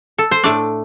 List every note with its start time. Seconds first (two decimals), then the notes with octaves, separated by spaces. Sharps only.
0.18 A4
0.31 C5
0.44 A2 A3 D4 D5